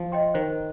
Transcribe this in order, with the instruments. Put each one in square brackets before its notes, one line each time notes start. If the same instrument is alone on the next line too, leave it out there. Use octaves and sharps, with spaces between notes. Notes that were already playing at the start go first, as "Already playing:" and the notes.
Already playing: [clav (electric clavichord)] F3
[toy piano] D#5 G5 C6
[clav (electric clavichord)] D#3 [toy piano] C5